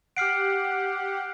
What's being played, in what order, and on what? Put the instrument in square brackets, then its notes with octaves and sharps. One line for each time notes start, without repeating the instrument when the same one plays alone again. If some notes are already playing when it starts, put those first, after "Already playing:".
[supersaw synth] G4 F#5 [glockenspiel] F6 C7 D7